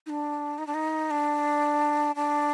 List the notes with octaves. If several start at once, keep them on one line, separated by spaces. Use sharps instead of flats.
D#4
D4
D#4
D4
D#4
D4
D4